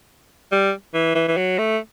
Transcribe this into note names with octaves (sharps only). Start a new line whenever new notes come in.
G3
E3
E3
E3
F#3
A3